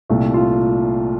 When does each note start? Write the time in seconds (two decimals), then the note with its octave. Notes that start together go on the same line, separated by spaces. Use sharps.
0.10 C2 A#2 A3
0.34 F4